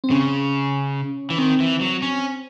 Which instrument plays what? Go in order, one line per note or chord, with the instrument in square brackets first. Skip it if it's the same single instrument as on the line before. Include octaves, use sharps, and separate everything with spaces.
[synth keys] C4
[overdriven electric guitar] C#3 [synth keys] C#4
[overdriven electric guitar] E3
[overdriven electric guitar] D#3 [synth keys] C4
[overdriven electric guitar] E3
F#3
C#4